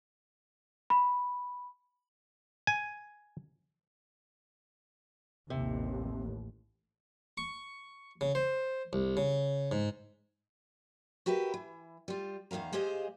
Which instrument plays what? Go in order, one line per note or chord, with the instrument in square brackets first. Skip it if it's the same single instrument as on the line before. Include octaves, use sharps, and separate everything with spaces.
[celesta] B5
[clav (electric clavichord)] G#5
[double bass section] A1 D#2 [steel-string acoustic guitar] C3
[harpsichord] C#6
C#3
C5
C2
C#3
G#2
[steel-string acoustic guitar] F#4 G4 A#4 B4 E5
E3
G3 F4
E2 D#3 C4 F5 A#5
G#3 G4 G#4 C5 D#5 F5